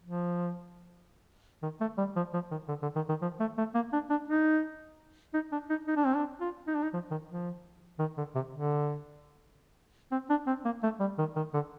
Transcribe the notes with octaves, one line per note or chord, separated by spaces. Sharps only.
F3
D#3
A3
G3
F3
F3
D#3
D3
D3
D#3
D#3
F3
A3
A3
A#3
D4
D4
D#4
D#4
D4
D#4
D#4
D4
C4
D4
F4
D#4
D4
D#4
F3
D#3
F3
D#3
D3
C3
D3
C4
D4
C4
A#3
A3
G3
D#3
D#3
D3